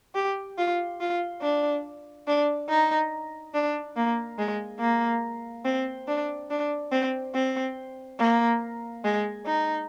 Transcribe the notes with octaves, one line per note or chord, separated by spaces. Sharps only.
G4
F4
F4
D4
D4
D#4
D4
A#3
G#3
A#3
C4
D4
D4
C4
C4
A#3
G#3
D#4